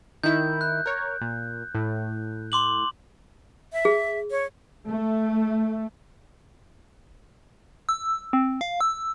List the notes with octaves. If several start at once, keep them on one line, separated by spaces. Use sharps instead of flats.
D#3 E4 G6
F#6
A#4 C#5
A#2
A2
C6 D6 F#7
E5
G#4
C#5
A3
E6
C4
F5
E6